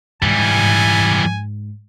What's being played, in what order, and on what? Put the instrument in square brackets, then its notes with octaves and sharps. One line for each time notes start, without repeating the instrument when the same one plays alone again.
[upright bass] G#2 [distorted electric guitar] E3 G3 [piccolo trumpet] G#5